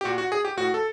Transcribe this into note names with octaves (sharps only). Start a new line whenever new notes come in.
G4
A#2 F#4
F#4
G#4
G4
A2 F#4
A4